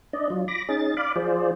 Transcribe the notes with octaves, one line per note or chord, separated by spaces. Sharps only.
D4 D5 D#5
F#3 F4
B5 D6 A#6
C#4 D#4 G#4 A6
D5 F5 B5 D6
F3 F4 G#4 C5 D5